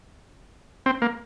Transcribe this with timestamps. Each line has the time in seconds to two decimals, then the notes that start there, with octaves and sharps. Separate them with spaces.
0.86 C4
1.02 A#3